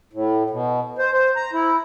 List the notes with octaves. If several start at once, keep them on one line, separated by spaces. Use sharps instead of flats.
A2
B2
C5
C5
A#5
E4